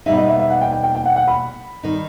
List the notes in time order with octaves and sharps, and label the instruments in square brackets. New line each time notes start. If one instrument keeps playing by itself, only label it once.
[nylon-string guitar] B2 G3 D#4 [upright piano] E5
[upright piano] D#5
E5
E5
F#5
G5
G5
G5
G5
F#5
F#5
B5
[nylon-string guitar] D#3 G3 D#4